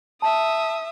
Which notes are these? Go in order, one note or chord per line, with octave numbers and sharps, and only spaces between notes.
E5 A5 D#6